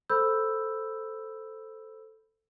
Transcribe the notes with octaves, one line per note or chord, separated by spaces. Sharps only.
A4 C5 B5 E6 G6